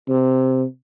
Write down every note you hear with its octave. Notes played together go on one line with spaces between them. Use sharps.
C3